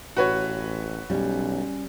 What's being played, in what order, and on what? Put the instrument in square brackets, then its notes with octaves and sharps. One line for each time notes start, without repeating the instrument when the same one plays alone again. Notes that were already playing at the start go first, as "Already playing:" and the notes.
[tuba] A1 [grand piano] F#4 B4 C#5
[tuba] B1 [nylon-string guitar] G3 C#4